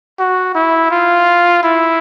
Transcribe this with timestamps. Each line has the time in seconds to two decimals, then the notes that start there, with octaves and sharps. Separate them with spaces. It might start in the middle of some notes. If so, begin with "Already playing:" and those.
0.19 F#4
0.55 E4
0.91 F4
1.63 E4